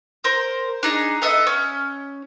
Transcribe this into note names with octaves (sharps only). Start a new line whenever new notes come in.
A#4 C5
D4 D#4 G#4
B3 A4 D#5 E5
C#4